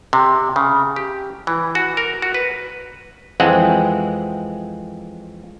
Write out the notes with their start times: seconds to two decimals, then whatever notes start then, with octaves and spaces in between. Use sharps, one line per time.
0.13 C3
0.56 C#3
0.96 G4
1.47 E3
1.75 F#4
1.97 A#4
2.22 F#4
2.34 B4
3.40 F2 E3 G#3 C4 F#5